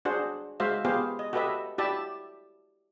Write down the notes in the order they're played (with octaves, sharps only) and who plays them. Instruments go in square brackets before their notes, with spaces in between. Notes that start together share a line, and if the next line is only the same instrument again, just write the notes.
[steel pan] D4 F#4 G#4 C5 F#5
G#3 F#4 C5 E5 F5
B3 F4 G4 G#4 C5 F5
D#5
F#4 G4 A4 B4 D#5 E5
E4 F#4 G4 D5 E5 A5